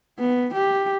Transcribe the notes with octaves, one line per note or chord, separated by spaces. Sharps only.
B3
G4